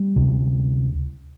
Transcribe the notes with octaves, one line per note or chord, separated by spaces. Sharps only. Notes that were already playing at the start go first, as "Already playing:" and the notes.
Already playing: G3
D2 C3